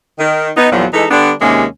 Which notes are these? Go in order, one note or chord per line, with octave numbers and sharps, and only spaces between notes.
D#3
B3 D#4
E2 A#2 F3 F#3
E3 G#3 D#4 A4
D3 G3 B3 D4
D#2 C3 G#3 A#3 C#4